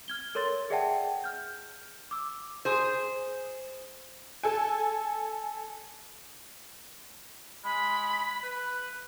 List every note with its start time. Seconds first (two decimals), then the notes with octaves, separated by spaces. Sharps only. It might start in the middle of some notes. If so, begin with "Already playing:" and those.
0.08 F6 G#6 G7
0.35 A4 A#4 C#5 C6 A6
0.70 G#4 D5 E5 F#5 G5 A5
1.24 F6 G6
2.11 D6 E6
2.65 G#4 C5
4.43 A4 G#5
7.64 G#3 B5
8.43 B4